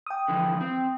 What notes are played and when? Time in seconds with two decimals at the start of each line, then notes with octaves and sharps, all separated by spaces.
0.07 G5 D#6
0.28 D3 E3 F3
0.61 C4